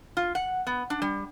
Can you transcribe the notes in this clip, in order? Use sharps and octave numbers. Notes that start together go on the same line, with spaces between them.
F4
F#5
B3
D4
G3